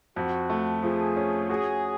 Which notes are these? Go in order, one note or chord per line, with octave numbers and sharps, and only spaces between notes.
F2 F#4
A3
F3 G#4
C#4
F#4 G#4